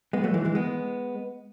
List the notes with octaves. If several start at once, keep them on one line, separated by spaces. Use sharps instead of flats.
G#3 B3
F#3 A3
E3 G#3
E3 G#3
G#3 B3